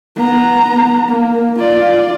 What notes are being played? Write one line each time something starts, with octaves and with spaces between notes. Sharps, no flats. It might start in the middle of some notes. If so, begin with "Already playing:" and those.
B3 A#5
A#3
F4 D5